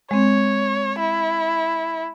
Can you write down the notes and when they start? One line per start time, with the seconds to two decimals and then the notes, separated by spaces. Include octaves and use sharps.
0.11 G#3 C4 C#5
0.99 E4